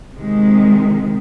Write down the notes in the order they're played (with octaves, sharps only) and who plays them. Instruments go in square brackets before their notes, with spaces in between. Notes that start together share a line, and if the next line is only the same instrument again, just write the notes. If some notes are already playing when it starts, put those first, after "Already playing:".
[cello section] C3 D#3 G#3